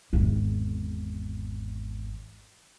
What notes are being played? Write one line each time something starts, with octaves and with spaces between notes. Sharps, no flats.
G#1 E2